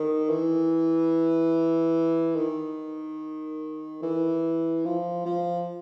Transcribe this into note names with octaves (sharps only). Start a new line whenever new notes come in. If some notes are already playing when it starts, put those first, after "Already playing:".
Already playing: D#3
E3
D#3
E3
F3
F3